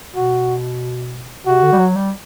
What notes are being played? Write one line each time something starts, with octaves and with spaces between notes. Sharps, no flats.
B2 F#4
C3 F#4
D3
G3
F#3
G3